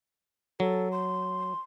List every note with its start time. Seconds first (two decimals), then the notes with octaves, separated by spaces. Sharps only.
0.60 F#3 A4
0.92 C6